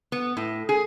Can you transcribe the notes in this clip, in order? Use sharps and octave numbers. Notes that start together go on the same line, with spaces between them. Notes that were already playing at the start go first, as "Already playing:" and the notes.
B3
A2
G#4